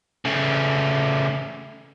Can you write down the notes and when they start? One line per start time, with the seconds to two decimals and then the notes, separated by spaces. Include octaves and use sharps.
0.25 C#3 A3